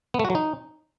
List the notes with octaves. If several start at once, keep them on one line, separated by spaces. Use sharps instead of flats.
B3
A3
F#4
F#3
D#4